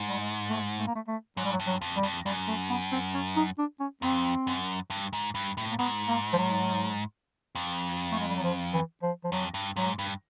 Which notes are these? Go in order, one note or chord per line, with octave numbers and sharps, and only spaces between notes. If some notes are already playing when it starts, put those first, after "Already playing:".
Already playing: G#2
G3
G#3
A3
A3
A#3
A3
A3
G#2 F#3
G3
F#3
G2
F#3
F2
G3
F2
F#2 G3
A3
B3
C4
C#4
D#4
D4
C#4
F2 C4
F#2
G2
G#2
G2
A2
A#3
G#2 B3
A#3
F3
F#3
F2
A3
G#3
G3
F#3
F3
E3
F3
F3
F2 F#3
G2
G#2 F#3
G2